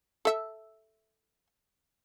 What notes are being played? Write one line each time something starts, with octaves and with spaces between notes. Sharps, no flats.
A4 E5